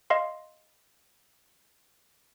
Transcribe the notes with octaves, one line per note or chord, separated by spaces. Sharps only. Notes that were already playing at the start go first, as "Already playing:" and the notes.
D#5 F5 C6